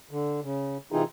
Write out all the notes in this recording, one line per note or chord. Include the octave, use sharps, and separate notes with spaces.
D3
C#3
C3 E3 C4 D#4 F4 G#4